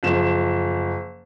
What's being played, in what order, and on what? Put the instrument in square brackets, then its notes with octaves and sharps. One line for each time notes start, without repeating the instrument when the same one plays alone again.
[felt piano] F#1 F3 E7